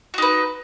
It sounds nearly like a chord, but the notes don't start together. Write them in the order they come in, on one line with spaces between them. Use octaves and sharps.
F#4 D#4 B4